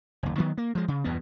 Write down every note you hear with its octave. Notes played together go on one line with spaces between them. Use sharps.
F#1 D#2
D#3 F#3 B3
A#3
F3 G#3
C#3
E2 G2 B2 B3